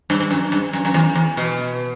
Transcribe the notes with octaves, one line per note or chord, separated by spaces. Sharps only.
G2
G2
F#2
G2
F#2
F#2
E2
E2
B2